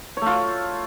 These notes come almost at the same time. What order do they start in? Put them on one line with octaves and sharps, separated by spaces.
C#5 A3 F4